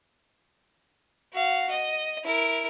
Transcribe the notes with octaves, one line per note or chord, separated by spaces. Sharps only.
F#4 F5
D#5
E4 A#4